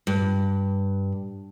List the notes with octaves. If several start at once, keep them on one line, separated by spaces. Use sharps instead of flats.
G2